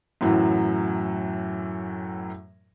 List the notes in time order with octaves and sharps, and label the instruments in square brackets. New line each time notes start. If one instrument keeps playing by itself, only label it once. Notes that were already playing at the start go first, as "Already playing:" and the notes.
[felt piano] F#2 A2 E3 F#3